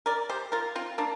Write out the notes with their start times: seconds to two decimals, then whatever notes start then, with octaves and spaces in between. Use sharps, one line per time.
0.06 A#4 D5
0.29 G4 C5
0.52 F4 A#4
0.75 C4 F4
0.98 A#3 D4